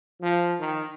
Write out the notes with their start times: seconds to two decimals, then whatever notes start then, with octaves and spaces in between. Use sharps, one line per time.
0.21 F3
0.59 D#3